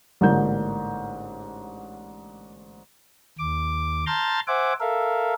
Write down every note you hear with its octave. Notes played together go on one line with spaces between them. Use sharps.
A1 G#2 D3 A#3 G6
D#2 D6
A5 A#5 C6 F6 G6 A6
C5 E5 F#5 G#5 D6
A4 A#4 E5 F5